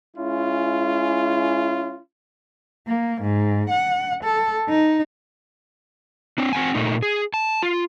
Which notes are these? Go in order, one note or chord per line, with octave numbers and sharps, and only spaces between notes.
G#3 C#4 E4 F4
A#3
G#2
F#5
A4
D#4
C4 D4
C4 F#5 G#5
A#2 A3 D#4
G#4
A5
F4